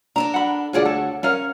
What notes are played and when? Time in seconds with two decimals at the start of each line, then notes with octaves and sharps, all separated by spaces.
0.16 D4 A4 A#4 A#5
0.34 F#5 B5
0.73 D2 F4 F#4 G#4 C#5 D5
0.85 A4
1.23 C#4 A#4 C#5 F5